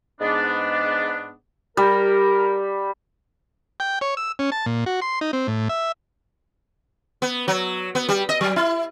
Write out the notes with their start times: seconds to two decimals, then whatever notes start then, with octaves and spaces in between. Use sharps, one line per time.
0.20 G#2 B3 D4
1.77 G3 A#4
3.80 G5
4.01 C#5
4.17 E6
4.39 C#4
4.52 A5
4.66 A#2
4.86 F#4
5.02 C6
5.21 D#4
5.33 C4
5.47 A2
5.69 E5
7.22 B3
7.48 F#3
7.95 B3
8.09 G3
8.29 D#5
8.41 F#3
8.56 E4